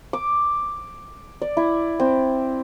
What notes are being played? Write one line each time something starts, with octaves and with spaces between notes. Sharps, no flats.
D6
D5
E4
C4